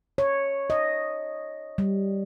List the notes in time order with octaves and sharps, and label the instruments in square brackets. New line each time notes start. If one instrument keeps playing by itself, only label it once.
[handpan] C#5
D#5
G3